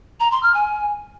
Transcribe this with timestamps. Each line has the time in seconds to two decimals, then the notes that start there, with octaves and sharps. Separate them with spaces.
0.20 A#5
0.31 C6
0.43 F6
0.54 G#5